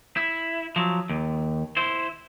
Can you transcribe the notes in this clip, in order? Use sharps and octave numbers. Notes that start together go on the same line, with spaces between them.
E4
F3 F#3
D#2
E4 C5